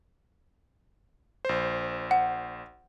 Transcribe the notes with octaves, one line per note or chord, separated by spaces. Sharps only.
A#1 C5
F#5